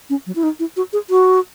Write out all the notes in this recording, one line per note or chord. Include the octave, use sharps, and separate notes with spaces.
C#4
F#3
E4
D#4
E4
F#4
G#4
F#4